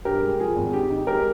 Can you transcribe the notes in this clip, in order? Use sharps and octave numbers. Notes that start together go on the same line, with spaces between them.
G2 G4 A#4
G#3
F3 G#4
G#1
D#3 G4
D#4
G#3 G4 A#4